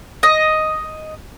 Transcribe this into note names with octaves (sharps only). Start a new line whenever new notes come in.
D#5